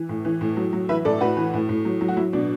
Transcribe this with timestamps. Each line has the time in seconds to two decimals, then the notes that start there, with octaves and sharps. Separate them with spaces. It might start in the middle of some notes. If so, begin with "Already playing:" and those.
Already playing: E3
0.09 A2
0.25 E3
0.41 A2
0.57 F#3
0.73 F#3
0.89 E3 B4 E5
1.05 A2 A4 D5
1.21 A2 F#4 B4
1.37 E3
1.54 A2
1.69 A2
1.85 F#3
2.01 F#3
2.08 F#4
2.17 F#3 E4
2.33 B2 D4